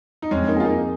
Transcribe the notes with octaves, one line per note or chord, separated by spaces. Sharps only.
D#4
F2 G#3 C#4
A#3 D#4
F4 G#4
A#3 D#4